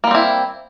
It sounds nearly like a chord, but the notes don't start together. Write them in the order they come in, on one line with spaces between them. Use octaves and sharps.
A#3 G3 C4 E4